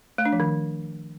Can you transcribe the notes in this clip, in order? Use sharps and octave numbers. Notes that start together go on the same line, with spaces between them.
A3
D4
F3
D#3